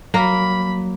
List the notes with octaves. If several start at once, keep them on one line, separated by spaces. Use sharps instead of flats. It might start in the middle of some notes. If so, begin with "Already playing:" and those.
F#3 A#3 A#4 B5